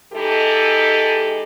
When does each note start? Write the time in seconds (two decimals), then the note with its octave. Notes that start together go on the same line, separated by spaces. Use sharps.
0.13 E3 G#3 D#4 G4 A4